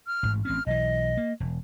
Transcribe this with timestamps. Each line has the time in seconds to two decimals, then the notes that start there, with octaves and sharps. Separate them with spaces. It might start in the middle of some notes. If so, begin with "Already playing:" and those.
0.07 F6
0.23 A1 G#2
0.45 A1 C4 C#4 F6
0.66 B1 E3 D#5
1.17 A#3
1.40 E1